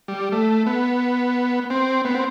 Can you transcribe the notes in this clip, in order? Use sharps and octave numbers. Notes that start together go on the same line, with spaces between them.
G3
A3
B3
C4
B3
C4